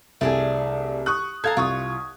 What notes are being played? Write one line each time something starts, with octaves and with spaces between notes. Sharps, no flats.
C2 A3 D4 G#4
C#6 D#6 F#6
A4 F5 A#5 G#6
C2 F4 C#6 D#6